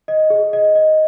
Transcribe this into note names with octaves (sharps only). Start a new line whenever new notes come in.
D#5
G#4
D#5
D#5